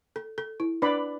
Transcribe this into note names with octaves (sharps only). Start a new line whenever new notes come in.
A4
A4
E4
D4 B4 D5 B5